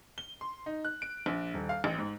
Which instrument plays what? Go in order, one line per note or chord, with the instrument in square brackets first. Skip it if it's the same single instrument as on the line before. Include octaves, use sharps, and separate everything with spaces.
[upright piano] G7
C6
D#4
F#6
D7
A#1
D#1
F5
A1
G#2